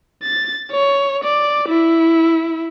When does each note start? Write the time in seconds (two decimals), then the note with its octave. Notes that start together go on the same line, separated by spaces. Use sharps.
0.23 A6
0.72 C#5
1.24 D5
1.69 E4